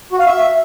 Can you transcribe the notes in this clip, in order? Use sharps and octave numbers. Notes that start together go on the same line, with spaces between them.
F#4
F5
E5